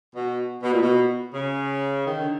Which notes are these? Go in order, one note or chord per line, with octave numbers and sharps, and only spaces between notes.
B2
B2
A#2
B2
C#3
D#3
D3